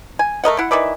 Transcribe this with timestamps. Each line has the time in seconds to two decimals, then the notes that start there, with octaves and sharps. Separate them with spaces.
0.19 G#5
0.44 A3 A#4 D#5 F#5
0.59 E4 F#5
0.71 D#3 E3 D5 E5